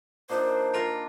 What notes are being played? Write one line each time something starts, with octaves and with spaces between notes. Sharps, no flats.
A#2 D4 D#4 C5
F4 A#4